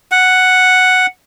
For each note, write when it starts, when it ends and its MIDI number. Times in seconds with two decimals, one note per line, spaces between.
0.12 1.06 78